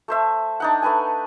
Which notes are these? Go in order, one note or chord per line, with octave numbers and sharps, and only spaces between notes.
A3 C5 E5
D4 D#4 F#5
A3 B4 G#5